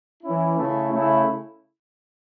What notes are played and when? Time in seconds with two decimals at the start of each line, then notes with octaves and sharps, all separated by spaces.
0.23 E3 C#4 E4
0.57 C#3 A3 E4
0.91 C#3 A3 E4